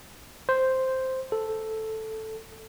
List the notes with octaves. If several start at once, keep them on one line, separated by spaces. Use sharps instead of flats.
C5
A4